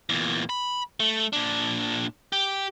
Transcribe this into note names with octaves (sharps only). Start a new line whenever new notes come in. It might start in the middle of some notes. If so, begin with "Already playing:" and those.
E2 A#2
B5
A3
A#2 D4
G4